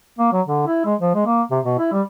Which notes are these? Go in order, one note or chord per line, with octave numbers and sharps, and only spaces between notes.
A#3
F#3
D3
E4
G#3
F3
G#3
A#3
C3
B2
E4
G3